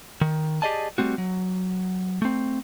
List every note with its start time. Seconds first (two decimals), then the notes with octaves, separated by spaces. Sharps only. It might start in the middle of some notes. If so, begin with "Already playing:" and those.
0.21 D#3
0.62 G4 G#4 D5 D#5 G#5 A5
0.98 G3 A3 C4 F#4
1.18 F#3
2.22 A3 C4